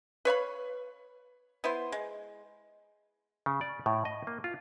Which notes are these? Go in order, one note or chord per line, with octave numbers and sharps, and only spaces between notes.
B4 C#5 F5 B5
B3 E4 C5
G#3
C#3
D5
A2
D#5
A#3
F4